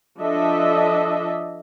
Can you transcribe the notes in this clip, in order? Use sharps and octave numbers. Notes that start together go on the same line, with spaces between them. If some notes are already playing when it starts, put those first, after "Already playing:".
F3 D4 A4 D#5 E5